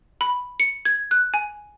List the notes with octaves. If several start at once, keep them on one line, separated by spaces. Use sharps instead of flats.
B5
C#7
G#6
F#6
G#5